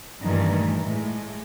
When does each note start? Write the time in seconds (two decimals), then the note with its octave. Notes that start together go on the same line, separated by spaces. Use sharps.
0.22 G2 A#2 D#3 E3 A3
0.82 A2 G#3